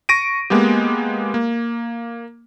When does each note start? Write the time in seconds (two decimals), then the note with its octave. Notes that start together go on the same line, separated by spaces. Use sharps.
0.09 C#6 A#6 D7 D#7
0.50 G#3 A#3 B3 G4
1.34 A#3